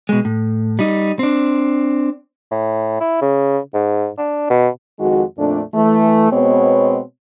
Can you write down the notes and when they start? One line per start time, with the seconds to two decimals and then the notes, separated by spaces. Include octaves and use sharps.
0.09 B2 G#3
0.25 A2
0.79 G3 D#4
1.19 C4 D4
2.51 A2
3.00 E4
3.21 C#3
3.74 G#2
4.18 D4
4.50 B2
4.99 F2 D#3 G#3 F#4
5.38 F2 A#2 A3 D4
5.74 E3 A3
6.31 B2 G#3 B3 C4 C#5